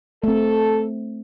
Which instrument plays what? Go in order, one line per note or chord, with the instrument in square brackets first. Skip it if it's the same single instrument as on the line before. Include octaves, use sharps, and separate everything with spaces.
[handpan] A3 C4 [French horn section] A4